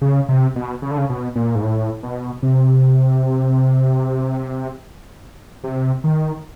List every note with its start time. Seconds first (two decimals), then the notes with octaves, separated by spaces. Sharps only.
0.01 C#3
0.29 C3
0.56 B2
0.82 C#3
0.91 D3
0.98 C#3
1.10 B2
1.35 A#2
1.55 G#2
1.62 A2
2.03 B2
2.43 C3
5.64 C3
6.04 D#3